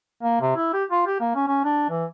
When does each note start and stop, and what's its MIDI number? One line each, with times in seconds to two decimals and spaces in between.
0.23 0.38 58
0.41 0.51 48
0.56 0.69 64
0.73 0.84 67
0.91 1.02 65
1.07 1.20 67
1.20 1.31 58
1.35 1.44 61
1.48 1.60 61
1.65 1.85 62
1.90 2.05 52